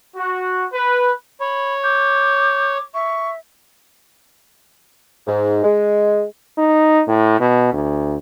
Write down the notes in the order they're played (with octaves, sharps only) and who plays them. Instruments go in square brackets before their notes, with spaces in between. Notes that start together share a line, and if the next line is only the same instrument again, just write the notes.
[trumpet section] F#4
B4
[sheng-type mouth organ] C#5 [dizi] B5
[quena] D6 [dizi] G6
[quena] E5 [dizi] C#6
[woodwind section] G#2
G#3
[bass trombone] D#4
A2
B2
D2